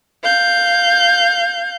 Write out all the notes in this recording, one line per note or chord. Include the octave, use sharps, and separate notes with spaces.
F5 G6